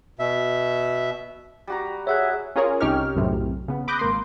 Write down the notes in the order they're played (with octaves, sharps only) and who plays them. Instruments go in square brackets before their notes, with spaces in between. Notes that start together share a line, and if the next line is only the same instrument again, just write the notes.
[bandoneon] B2 E5
[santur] G3 F#4 A#5
[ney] G#4 [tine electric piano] C#5 F#5 F#6 [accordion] E5
[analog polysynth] C#4 F4 G#4 A#4 C#5
C2 C#4 D#4 G4 C#5 F6
B1 F#2 A2 C3
C#3 B3
B5 D6 D#6 F#6 G6 A#6
G#1 A#3 C6